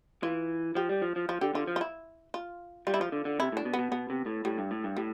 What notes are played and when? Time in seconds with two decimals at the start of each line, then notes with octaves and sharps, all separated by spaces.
0.23 E3 F4
0.75 F3 G4
0.89 G3
1.02 F3
1.16 F3
1.29 F3 F4
1.41 D3 G4
1.55 D3 F4
1.67 F3
1.76 F4
1.81 E4
2.34 F4
2.87 G3 F4
2.94 E4
3.00 F3 F4
3.12 D3
3.25 D3
3.39 C3 E4
3.52 A2 D4
3.65 B2
3.74 B3
3.79 B2
3.91 B2 B3
4.10 C3
4.26 A2
4.45 A2 G3
4.58 G2
4.71 A2
4.84 G2
4.97 A2 G3